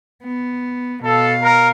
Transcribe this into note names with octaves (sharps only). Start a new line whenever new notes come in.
B3
B2 A4 F5
A#4